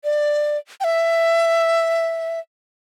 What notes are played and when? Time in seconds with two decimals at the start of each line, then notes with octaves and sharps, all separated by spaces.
0.04 D5
0.80 G5
0.84 E5